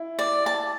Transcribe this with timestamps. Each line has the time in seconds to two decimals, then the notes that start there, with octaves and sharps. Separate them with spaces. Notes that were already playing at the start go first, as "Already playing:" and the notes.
Already playing: E4
0.19 D5
0.46 A5